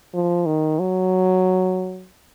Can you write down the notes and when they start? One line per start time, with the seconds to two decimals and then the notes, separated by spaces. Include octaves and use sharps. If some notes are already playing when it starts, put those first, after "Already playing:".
0.14 F3
0.46 D#3
0.79 F#3